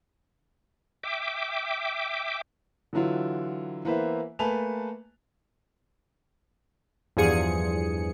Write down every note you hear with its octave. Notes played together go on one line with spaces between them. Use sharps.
E5 G5 D6
D3 E3 F#3 E4 F4
E3 A#3 B3 B4 C5 E5
A3 A#3 B4 G#5 A5 F7
E2 G2 F3 G#4 C#7